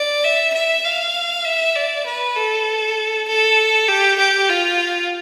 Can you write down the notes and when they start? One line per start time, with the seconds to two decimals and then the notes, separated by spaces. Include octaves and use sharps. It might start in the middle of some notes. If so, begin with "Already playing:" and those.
Already playing: D5
0.24 E5
0.53 E5
0.84 F5
1.45 E5
1.75 D5
2.06 B4
2.36 A4
3.28 A4
3.88 G4
4.18 G4
4.49 F4